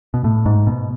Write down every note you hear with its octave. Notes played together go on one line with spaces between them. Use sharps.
B2
A2
G#2
B2